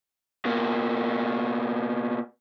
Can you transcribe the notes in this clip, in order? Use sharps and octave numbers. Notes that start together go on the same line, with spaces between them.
B2 A#3